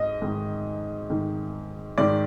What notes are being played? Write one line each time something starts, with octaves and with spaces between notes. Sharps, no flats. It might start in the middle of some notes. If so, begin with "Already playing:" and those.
Already playing: G#2 D#5
G#2 D#3
G#2 D#3
G#2 D#3 D5